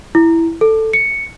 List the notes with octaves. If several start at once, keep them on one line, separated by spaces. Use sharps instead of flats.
E4
A4
C#7